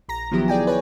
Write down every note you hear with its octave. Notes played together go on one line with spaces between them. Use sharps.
A#1 A#5 A#6
D#3 F3 F#3 B3 E4 G4
G#4 D5 G5 G#5
B4 C#5 G#5